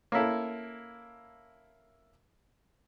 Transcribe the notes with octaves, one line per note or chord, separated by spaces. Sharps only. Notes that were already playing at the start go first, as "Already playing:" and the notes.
A#3 C#4 E4 A4